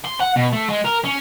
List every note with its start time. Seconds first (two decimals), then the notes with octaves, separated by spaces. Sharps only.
0.05 C6
0.20 F#5
0.36 B2
0.53 A3
0.69 G#3
0.85 A#4
1.05 C#4